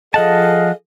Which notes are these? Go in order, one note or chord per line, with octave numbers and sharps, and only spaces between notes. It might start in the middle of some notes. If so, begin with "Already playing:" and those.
F3 G#4 A4 D#5 F5 F#5 A5